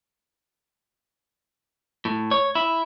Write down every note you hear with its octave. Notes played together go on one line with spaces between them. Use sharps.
A2
C#5
E4